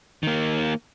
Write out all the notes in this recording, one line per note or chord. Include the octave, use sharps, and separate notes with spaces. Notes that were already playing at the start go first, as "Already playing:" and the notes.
D#3 A#3